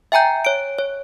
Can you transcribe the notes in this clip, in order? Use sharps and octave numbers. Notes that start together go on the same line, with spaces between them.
E5 G5 G#5 A#5 G6
C#5 D7
C#5